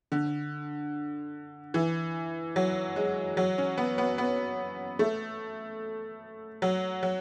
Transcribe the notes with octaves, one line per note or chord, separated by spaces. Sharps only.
D3
E3
F#3
G#3
F#3
C#4
B3
B3
B3
A3
F#3
F#3